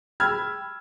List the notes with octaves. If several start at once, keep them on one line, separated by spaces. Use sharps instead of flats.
G5 B5 E6 F6 G#6